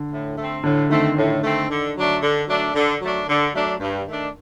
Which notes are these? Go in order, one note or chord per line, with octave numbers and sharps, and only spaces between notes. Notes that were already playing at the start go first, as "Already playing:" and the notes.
Already playing: D3
A2
A3 C4
A2 D3
D#3 A3 C4
A2
A3 C4
D3
F#3 A3 D4
D3
F#3 A3 D4
D3
F#3 A3 D4
D3
F#3 A3 D4
G2
D#3 A3 D4